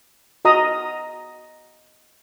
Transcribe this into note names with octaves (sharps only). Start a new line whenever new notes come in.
F#4 D#5 A#5 D#6